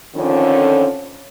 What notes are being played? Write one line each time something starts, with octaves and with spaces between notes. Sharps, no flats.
F2 D3 D#3 F3 C#4